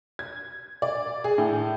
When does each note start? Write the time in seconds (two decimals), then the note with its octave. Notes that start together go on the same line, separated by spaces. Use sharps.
0.19 G#6
0.82 D5
1.24 G#4
1.38 A2